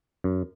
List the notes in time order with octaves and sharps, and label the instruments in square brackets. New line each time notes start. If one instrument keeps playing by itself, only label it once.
[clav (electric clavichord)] F#2